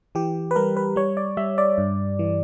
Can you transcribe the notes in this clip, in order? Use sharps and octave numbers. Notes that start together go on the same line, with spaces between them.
E3 G4
B4
G3 A#4
B4
G3 C#5
D5
G3 E5
D5
G2
E3